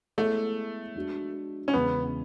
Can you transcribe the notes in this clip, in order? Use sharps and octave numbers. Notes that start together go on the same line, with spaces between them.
G#3 A3 B3 E4 G#4 C#5
G#3 D4 F#4
C#4
E2 C#3 G#3 B3